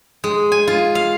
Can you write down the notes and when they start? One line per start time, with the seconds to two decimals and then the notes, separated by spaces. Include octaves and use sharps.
0.24 G#3
0.52 G#5
0.67 F4
0.95 F5